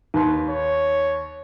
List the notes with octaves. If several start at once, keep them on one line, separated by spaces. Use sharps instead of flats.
D#2 D#4 B4 C6
C#5